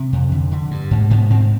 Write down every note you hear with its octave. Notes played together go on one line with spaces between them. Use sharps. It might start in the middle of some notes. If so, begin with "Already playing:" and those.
Already playing: C3 C4
F2
D3
D3
G2
G#2
G#2 B3
G#2 C4